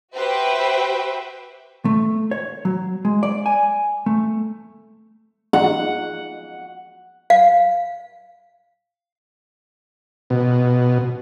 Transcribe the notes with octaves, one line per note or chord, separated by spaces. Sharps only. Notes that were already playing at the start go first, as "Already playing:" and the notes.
F#4 G4 B4 C5 E5 G5
A3
C#5
F#3
G#3
D5
G#5
A3
F#5
F5
B2